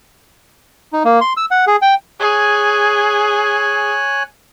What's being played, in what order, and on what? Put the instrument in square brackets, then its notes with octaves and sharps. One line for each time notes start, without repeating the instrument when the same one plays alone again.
[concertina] D#4
A#3
C6
E6
F#5
G#4
G5
[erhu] G#4 [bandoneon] C#5 G#5 F#6